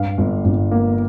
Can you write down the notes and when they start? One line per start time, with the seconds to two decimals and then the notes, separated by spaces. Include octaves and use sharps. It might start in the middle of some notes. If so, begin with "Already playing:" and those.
Already playing: G2 F5
0.18 G1
0.45 G1
0.71 A#3